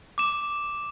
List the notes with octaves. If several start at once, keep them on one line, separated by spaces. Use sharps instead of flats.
D6 E7